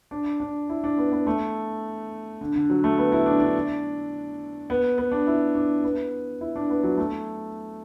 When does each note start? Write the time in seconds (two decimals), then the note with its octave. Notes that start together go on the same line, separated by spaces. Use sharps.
0.11 D4
0.40 D4
0.69 E4
0.84 D4
0.98 B3
1.12 B3
1.27 A3
2.41 D3
2.55 D3
2.70 F#3
2.84 A3
2.98 B3
3.12 E4
3.26 D4
3.40 D4
4.70 B3
4.98 B3
5.12 D4
5.27 E4
5.55 D4
5.84 B3
6.41 E4
6.56 D4
6.70 B3
6.83 F#3
6.98 A3